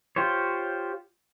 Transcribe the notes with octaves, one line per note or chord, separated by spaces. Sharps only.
F4 G4 C5 C#5